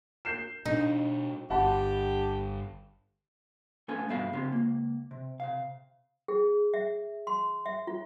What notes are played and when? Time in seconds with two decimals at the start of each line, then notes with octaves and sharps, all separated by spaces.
0.25 G6 C7 E7
0.66 B2 D4 D#4
1.50 G1 G4 F#5 A5 B5
3.88 A3 B3 C#4 F4 A4 G#5
4.09 G2 B2 B3 E5 F5 B5
4.33 C#3 C4 F4 G4
4.52 C#2 A#3
5.11 C3
5.40 C3 F5
6.28 G#4
6.74 E5
7.27 C6
7.66 E5
7.87 F4